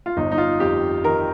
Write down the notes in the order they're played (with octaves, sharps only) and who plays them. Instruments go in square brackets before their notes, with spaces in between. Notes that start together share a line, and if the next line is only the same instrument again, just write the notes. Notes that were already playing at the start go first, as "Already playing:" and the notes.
[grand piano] F4
G1 D#4
D#4
F4
F2 G4
D#3 A#4